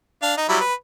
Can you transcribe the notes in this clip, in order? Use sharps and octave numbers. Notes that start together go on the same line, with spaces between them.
D4 F5
D#4
F#3 G3 E4
B4